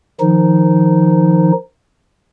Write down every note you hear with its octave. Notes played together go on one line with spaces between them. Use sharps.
D#3 F3 D#4